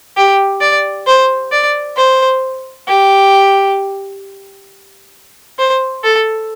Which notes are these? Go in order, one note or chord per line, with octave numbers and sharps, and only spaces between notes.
G4
D5
C5
D5
C5
G4
C5
A4